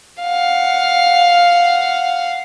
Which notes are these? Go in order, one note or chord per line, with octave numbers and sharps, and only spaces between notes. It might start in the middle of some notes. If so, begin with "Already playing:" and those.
F5 F#5